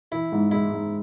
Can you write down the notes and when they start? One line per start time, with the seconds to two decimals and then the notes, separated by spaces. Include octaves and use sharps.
0.11 E3 E4
0.32 G#2
0.52 G#3 E4
0.72 G#2